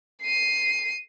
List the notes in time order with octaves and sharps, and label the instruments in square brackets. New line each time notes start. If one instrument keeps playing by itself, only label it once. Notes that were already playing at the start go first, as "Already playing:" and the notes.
[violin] C7 D#7